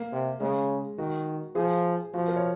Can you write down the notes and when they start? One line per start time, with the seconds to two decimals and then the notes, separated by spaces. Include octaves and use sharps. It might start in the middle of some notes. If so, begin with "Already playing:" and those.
Already playing: A#3
0.13 C3
0.40 C#3 G#3
0.98 D#3 F#4
1.55 F3 G#4
2.14 F3 F#4
2.28 A#4
2.36 C#5